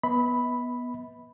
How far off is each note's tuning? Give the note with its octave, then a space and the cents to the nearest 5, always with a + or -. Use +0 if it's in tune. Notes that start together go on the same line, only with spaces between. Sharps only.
B3 -10 E5 -45 B5 +0